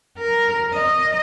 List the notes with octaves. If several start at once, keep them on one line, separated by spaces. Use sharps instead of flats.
A#4
D#5